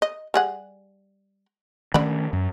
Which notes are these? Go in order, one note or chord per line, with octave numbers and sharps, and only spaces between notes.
D#5
G3 G#4 F#5
D3 D#3 A3 C#4 D5 B5
F#2